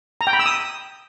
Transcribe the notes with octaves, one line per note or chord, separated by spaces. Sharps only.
A#5
G5
B5
E6
D#6